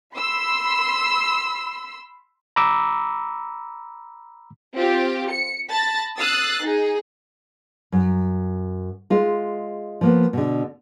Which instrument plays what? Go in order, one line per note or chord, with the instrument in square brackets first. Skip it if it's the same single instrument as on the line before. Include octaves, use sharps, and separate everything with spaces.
[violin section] B5 C6 E6
[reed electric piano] A#5 B5 D6 E6
[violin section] C4 F4 G4
C#7
A5 B5 A6 A#6
D#6 E6 F#6 A6 C7
D#4 G#4
[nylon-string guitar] F#2
G#3 F4
F3 A#3 B3
B2 D3